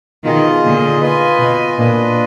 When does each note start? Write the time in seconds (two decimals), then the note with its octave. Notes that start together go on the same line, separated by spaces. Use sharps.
0.24 B2 D#3 F4 G#4 D#5
0.63 A#2 D3
1.01 F4 B4 D#5 G#5
1.39 B2
1.78 A#2 D4 F4 B4 D#5